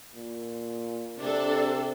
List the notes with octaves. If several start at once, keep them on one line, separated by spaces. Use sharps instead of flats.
A#2
C3 D4 A4